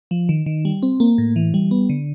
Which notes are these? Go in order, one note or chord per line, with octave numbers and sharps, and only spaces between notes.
F3
D#3
D#3
G3
C4
A#3
A2
E3
G3
B3
D3